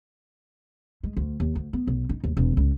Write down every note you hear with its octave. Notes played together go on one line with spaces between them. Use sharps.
G#3
D2
D#2
D2
B3
B1
D#4
D#2
E1
C#2